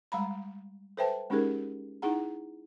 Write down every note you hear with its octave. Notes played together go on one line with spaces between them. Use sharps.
G3 G#3 F5 A#5 B5
A4 B4 C5 E5 G5 A5
G#3 C#4 D#4 G4 G#4 A#4
D#4 E4 G#4 F#5 A#5